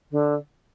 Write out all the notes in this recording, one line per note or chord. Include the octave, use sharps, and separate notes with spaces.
D3